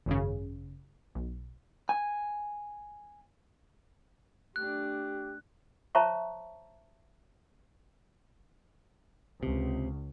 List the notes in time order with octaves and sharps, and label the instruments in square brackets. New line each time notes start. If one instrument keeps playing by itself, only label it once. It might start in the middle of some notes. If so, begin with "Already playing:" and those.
[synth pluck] G#1 F#2 C#3
B1
[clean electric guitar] G#5
[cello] A3 D4 [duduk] G4 [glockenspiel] F#6
[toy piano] C5 C#5 E5 A5 A#5 C#6
[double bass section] C#2 [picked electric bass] C3